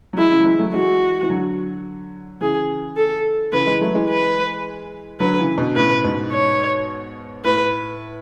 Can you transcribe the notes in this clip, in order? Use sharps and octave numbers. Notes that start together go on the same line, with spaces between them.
F#3
E3 G#3 E4
C#3 E3
F#3
E3 G#3
F#3 A3
E3 G#3 F#4
E3
D3 F#3
C#3 E3 G#4
A4
C#3 E3 B4
E3 G#3
F#3 A3
E3 G#3
B4
D3 F#3 B4
C#3 E3
B2 D3
A2 C#3 B4
G#2 B2
C#5
A2 B4